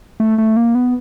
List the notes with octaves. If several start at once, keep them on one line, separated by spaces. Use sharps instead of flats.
A3
A3
A#3
B3